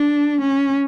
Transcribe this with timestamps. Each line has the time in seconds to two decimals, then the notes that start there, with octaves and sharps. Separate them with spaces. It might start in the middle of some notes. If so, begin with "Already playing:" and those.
Already playing: D4
0.41 C#4